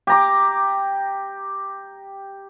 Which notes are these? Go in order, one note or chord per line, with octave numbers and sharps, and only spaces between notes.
G4 A#5 D6